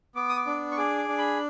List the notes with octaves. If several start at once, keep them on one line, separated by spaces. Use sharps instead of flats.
B3 D6
D#6
D6
D4
C#6
G#4 D6
D6
D4
B5